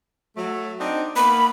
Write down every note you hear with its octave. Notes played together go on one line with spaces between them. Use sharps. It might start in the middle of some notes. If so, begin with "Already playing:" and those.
F#3 A3
C4 D4 D#4
A#3 B3 B5